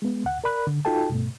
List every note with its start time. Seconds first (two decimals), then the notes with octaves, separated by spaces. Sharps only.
0.02 G#3 B3
0.25 D2 F#5
0.44 A#4 D5 B5 F#6
0.67 D3
0.85 D#4 F4 F#4 A4 G5 A5
1.11 G2 B2 A3